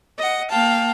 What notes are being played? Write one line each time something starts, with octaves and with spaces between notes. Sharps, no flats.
D#5 F#5
A#3 F5 G5 A5